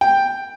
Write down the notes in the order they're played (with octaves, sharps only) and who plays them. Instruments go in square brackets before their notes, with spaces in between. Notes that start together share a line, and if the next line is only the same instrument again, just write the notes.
[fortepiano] G5